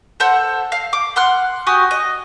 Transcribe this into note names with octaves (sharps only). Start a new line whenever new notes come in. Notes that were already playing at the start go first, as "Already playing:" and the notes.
A4 C5 F#5
F5
D6
F#5 C6 F6 F#6
F#4 G4 G#5 D#6
D#5